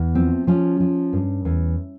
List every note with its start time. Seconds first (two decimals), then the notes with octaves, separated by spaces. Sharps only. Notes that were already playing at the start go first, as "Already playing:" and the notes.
Already playing: E2
0.15 F3 C4
0.47 F3 C#4
0.80 F3
1.13 G2
1.45 E2